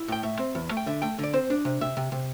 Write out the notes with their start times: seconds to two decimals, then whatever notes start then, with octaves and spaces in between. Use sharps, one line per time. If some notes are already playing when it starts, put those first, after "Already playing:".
Already playing: E4
0.08 A2 G5
0.23 A3 E5
0.39 C4
0.55 E2
0.71 A3
0.77 G5
0.86 D3 E5
1.02 A3 G5
1.19 D3 D5
1.33 C4 C5
1.50 D4
1.65 C3
1.81 C3 E5
1.97 C3
2.12 C3